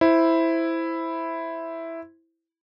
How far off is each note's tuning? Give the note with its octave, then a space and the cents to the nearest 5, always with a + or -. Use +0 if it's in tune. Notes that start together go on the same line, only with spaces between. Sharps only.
E4 +0 C5 +0